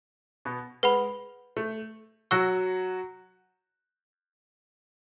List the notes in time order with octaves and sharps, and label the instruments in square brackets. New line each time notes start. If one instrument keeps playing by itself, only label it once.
[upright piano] B2 B3
[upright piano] G#3 [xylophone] B4 F#5 B5
[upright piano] A3
[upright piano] F#3 F#4 [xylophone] F#5 C#6 E6